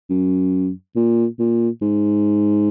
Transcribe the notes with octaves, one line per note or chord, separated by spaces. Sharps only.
F#2
A#2
A#2
G#2